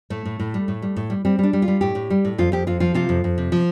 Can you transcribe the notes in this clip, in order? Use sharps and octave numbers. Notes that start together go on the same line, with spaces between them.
A2 A3
A2
A2
G3
A2
G3
A2
G3
G3 C4
G3 D4
G3
F4
G3
A2 G4
A2
G3
A2
F2 F4
F2 G4
F2 F4
F3 F4
C3 F4
F2
F2
C3
F3